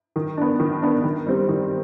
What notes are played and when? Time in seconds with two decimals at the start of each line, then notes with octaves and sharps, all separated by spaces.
0.16 D#3
0.37 B3 D4
0.60 D#3
0.82 B3 D4
1.04 D#3
1.26 G3 C4
1.48 D#3